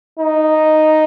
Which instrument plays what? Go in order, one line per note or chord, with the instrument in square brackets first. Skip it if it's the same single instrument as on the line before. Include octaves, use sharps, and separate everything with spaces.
[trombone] D#4